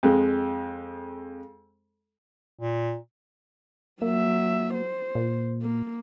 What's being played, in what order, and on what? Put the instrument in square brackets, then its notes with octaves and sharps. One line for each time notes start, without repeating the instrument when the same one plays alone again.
[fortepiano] F2 G#3
[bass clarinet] A#2
[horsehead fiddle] F#3 E5 [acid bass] A#3
[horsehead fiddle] C5
[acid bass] A#2
[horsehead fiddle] A#3